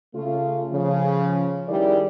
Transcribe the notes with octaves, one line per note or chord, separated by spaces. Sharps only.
C#3 A3 F4
C#3 F3
D#3 G3 E4 G#4 D5